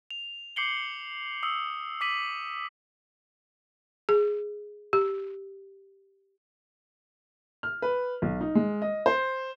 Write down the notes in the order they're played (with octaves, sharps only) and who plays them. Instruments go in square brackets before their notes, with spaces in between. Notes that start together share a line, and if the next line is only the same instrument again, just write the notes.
[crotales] F7
D6 G6 C7 C#7 F#7 G7
D#6 E6 C#7
D6 E6 B6 D#7 F#7
[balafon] G#4
G4
[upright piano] F6
B4
B1
D#4
G#3
D#5
C5